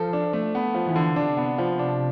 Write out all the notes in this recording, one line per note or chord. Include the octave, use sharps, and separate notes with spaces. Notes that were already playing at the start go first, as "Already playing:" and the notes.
Already playing: F3 A4
D4
A3
B3
F3
E3
D3
C3 D4
B3
F3
D4